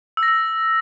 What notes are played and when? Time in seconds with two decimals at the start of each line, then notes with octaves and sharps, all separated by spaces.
0.17 E6
0.23 A#6
0.28 E6